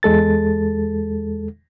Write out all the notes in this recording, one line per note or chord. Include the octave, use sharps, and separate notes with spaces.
E2 G#3 A4 A6